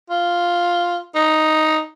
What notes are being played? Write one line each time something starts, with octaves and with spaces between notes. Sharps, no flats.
F4
D#4